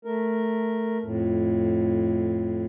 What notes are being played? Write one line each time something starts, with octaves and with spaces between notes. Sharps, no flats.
A3 A#4
F2 A2